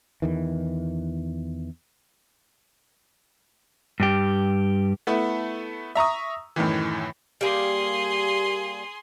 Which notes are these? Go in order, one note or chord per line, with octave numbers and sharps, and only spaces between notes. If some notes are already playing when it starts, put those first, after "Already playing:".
E2 D#3 E3
G2 G4
A3 B3 E4
E5 A#5 C#6 D#6
F#2 A2 D#3 E3
G3 A#3 G#4 C6